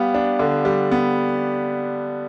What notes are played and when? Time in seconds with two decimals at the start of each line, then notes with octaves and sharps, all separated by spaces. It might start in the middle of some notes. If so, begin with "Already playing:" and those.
Already playing: G3 B3 F5
0.14 D4
0.39 D3
0.65 G3
0.91 B3